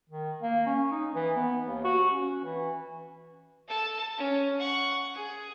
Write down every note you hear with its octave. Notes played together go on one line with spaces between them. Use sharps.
D#3
A#3
C#4
D#4
E3
B3
D#2
F#4
C#4
E3
A4 A5
C#4
F#5 C#6
G#4